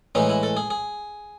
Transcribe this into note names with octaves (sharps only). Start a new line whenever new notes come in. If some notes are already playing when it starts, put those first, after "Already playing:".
A2 E3 G#3 D#4
E4
A4
G#4
G#4